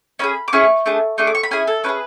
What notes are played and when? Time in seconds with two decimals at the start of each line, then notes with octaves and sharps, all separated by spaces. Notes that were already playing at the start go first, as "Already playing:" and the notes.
0.19 C#4 E4 G#4 B5
0.48 D6
0.53 C#4 E4 G#4 C#6
0.86 A3 D4 G#4
1.18 A3 D4 G#4 C#6
1.27 D6
1.35 C#6
1.43 B5
1.51 C#4 E4 G#4 G#5
1.67 A4
1.84 C#4 E4 B4
1.89 G#4